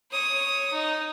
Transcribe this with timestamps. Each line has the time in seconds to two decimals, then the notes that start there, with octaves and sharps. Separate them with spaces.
0.11 C#5 D#6
0.72 D#4